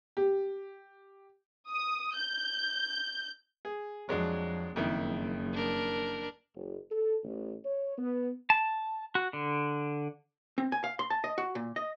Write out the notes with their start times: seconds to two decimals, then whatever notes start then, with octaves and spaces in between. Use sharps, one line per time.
0.17 G4
1.69 D#6
2.16 G6
3.65 G#4
4.09 F2 F#3 G#3 D4
4.76 F#1 F2 D#3 E4
5.53 D4 A#4
6.55 F#1
6.92 A4
7.24 A1
7.65 C#5
7.99 B3
8.50 A5
9.15 F#4
9.33 D3
10.58 C4
10.72 G#5
10.84 F5
10.99 C6
11.10 A5
11.24 D#5
11.38 F#4
11.55 A#2
11.76 D#5